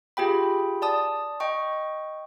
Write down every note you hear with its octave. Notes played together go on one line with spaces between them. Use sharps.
F4 G4 G#4 G5 B5
D5 A5 D#6
D#5 G5 C#6